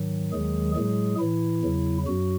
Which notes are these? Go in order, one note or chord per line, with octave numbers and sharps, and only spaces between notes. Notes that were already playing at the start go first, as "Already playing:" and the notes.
Already playing: G#2 D#3 F#3
D#2 D#3 F#3 G#3 G#4
A2 F#3 G#3 G#4
A2 E3 E4
E2 C#3 F#3
F#2 F#3 F#4